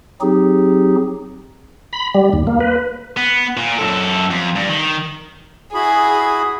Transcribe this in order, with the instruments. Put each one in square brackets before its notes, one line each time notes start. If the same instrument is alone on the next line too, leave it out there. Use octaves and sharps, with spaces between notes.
[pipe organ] F#3 C4 D#4 G4 G#4
[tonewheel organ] B5
G3
D#2
A#3
B4
[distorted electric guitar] B3
A#2
F#2 A4
F2
G2
D#3
[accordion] E4 F#4 B5 [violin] G#4 [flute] D#6